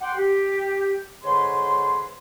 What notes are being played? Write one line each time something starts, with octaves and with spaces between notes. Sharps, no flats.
F#5 G5 C6 D6
G4
G#2 D3 B4 C#5 C6